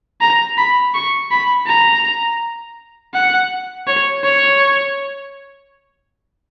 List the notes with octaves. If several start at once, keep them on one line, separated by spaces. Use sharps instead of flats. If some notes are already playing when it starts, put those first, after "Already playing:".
A#5
B5
C#6
B5
A#5
F#5
C#5
C#5